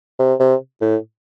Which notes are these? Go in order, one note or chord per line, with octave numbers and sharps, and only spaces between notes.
C3
C3
A2